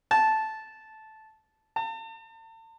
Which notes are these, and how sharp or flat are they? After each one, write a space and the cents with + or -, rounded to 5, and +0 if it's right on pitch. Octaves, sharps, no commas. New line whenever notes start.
A5 -10
A5 +40